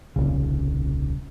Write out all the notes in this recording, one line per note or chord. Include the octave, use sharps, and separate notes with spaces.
D#1 C2 C#3